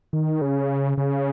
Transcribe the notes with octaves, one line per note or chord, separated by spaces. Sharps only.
D#3
C#3
C#3